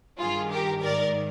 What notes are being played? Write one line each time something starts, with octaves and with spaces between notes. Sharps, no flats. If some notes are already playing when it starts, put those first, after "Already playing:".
G2 D#3 F4 G#4
G4 A#4
G#2 D#3 A#4 D5